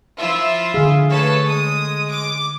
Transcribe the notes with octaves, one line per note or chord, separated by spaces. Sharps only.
F3 E4 F4 E5
D3 G#4 F5
A3 A4 B4 C#5
G#3 D#6
D6